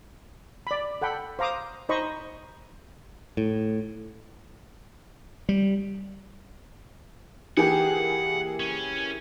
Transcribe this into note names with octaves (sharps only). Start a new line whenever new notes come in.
D5 B5
A4 F#5 G5 B5
C5 F5 A#5 D6 D#6
D#4 C5 D#5 B5 C#6
A2
G3
E3 A#3 G4 G#4 F#5
C#4